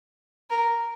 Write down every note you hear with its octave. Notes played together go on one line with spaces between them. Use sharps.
A#4